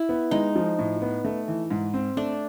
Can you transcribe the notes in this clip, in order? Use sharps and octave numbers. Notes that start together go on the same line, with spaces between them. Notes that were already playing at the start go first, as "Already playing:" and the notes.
Already playing: E4
B3
G#3 D#4
F3
A2
B3
A3
E3
G#2
C4
A3 D4